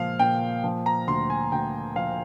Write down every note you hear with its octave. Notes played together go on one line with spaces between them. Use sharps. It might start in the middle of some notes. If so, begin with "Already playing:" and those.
Already playing: A#2 F3 G#3 F5
A#2 G5
F3
A#5
D2 C6
G#5
D2 G5
F3 F5